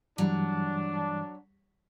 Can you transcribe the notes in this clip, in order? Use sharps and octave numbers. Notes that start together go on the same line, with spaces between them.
G2 E3 F#3 G3 D4